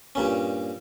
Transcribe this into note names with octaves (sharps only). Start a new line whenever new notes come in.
G2 A#2 C#4